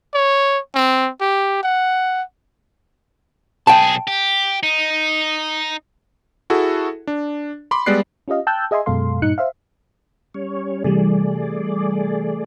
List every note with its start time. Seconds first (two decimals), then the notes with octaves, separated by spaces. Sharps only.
0.14 C#5
0.75 C4
1.21 G4
1.63 F#5
3.67 B1 G#4 G5 A5
4.07 G4
4.63 D#4
6.50 E4 F#4 G#4 A4
7.07 D4
7.71 B5 C6 D6
7.86 G3 G#3 B3 D5 F#6 C7
8.28 C#4 F4 G4 D#5 F5
8.47 G5 A5 E6 F#6 G6
8.71 G#4 D#5 E5 G#5 C6
8.86 F#2 B2 G#3 A4 F5 C6
9.22 G2 A#2 D#4 F#6 C#7
9.38 C5 E5 F5
10.34 G3 C#4 C#5
10.84 C3 E3 G3 A3 G#4 D5